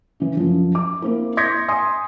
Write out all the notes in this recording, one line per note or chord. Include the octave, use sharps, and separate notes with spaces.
C#3 E3
F#2 F3
D6
A#3 C4 E4
C6 G6 G#6 A#6 B6 C#7
G#5 C6 D#6